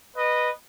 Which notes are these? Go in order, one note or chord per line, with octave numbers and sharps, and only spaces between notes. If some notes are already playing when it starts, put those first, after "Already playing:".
B4 D#5